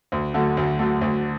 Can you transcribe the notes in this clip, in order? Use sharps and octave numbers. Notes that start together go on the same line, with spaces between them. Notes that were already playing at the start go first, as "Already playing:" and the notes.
D2
D3 F#3 A3
D2
D3 F#3 A3
D2